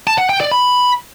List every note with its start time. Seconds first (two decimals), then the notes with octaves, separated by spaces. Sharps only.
0.07 A5
0.18 F#5
0.29 G5
0.40 D5
0.51 B5